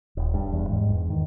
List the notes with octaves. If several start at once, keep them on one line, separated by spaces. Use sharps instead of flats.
D#1
G2
E2
G#2
E2
D#3